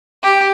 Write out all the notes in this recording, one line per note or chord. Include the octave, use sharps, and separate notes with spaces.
G4